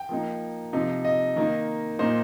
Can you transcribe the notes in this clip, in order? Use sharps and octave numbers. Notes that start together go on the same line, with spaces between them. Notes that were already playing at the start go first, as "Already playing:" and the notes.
Already playing: G5
F3 A#3 D#4
C3 F3 D#4
D#5
D#3 A#3 D#4
A#2 A#3 D#4 C5